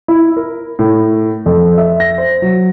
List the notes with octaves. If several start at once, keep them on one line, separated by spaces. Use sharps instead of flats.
E4
A#4
A2
F2
E5
A#6
C5
F#3